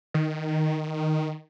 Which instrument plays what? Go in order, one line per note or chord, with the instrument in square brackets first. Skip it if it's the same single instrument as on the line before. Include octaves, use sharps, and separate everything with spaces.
[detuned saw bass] D#3